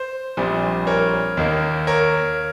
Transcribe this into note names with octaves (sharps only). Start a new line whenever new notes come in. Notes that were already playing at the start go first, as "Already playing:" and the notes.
Already playing: C5
A#1 A#2 G3 C4
A#4 C#5
D#2 D#3 A#3
A#4 C#5